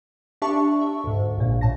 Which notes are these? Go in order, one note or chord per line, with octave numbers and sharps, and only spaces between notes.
D4 G4 D5 E5 A5 C#6
E5
D2 G#2
A#1 A#2
A2 A5 A#6